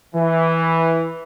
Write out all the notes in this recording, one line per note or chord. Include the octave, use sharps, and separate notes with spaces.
E3